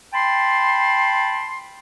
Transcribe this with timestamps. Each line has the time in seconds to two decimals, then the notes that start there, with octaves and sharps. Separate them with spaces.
0.13 G5 A5 B5 C6